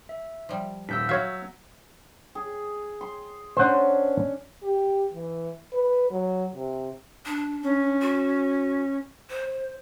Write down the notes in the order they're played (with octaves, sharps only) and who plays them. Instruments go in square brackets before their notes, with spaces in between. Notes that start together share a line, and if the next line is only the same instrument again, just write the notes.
[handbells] E5
[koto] F3 G3
[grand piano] D#1 [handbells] E6 G6 B6
[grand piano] F#3 [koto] F#4 E5 [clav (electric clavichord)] C#5 F5
[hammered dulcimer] G#4
C6
[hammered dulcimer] C#4 D4 [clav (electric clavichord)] C5 F#5
[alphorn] G4
E3
B4
F#3
C3
[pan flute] D4
[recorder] C#4
[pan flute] F#4
C5